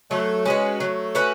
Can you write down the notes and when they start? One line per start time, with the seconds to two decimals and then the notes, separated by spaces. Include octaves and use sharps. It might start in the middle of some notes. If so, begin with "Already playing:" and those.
0.11 F#3 A3
0.46 G#3 C#4 F#4 B4
0.80 F#3 A3
1.15 C#4 F#4 B4